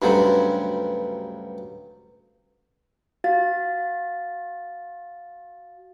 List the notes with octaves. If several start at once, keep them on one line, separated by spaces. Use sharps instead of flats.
D2 G2 C#3 F#3
F#4 F5 A6